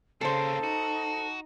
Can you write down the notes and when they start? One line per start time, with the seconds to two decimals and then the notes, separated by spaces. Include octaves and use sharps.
0.21 C#3 A#3 C4 A4 C5 A5
0.64 D#4 F#4